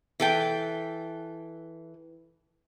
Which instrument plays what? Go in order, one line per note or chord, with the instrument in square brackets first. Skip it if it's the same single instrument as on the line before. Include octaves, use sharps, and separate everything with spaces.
[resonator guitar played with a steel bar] E3 A4 G5